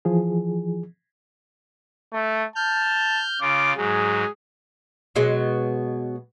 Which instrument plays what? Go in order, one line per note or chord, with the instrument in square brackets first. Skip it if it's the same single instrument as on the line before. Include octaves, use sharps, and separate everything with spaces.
[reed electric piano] E3 F3 G#4
[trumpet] A3
[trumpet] A5 [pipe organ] F6 G6
[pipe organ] C#3 F4 [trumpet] D6
[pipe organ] G#2 F#3 [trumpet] G#4
[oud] B2 F#3 G#3